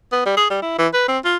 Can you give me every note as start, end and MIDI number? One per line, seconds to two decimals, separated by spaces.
0.12 0.25 59
0.26 0.35 55
0.37 0.45 68
0.50 0.60 55
0.62 0.78 64
0.78 0.87 52
0.94 1.04 71
1.08 1.18 60
1.25 1.37 65